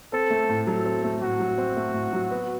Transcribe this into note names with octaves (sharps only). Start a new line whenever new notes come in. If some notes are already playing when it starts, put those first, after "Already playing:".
C4 A4
A3
A2
F#3 A4
C4
A3
A2 F#4
F#3
C4
A3
A2
F#3
B3